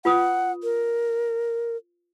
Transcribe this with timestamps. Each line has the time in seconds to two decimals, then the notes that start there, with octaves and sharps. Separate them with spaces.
0.05 F4 B4 F#5 D#6
0.63 A#4